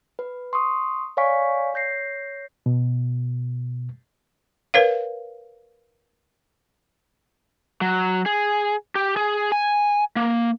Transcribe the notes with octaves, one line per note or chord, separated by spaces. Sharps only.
B4
C6 C#6 D#6
C#5 D5 F5 G#5 C#6 B6
C#5 G6 A#6 C7
B2
A#4 B4 C#5 F5
F#3
G#4
G4
G#4
G#5
A#3